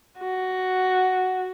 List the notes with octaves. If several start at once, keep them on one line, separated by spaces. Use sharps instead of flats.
F#4